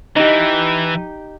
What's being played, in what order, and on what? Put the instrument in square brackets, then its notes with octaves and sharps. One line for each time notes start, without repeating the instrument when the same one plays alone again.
[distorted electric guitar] E3 [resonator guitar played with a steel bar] D#4 G4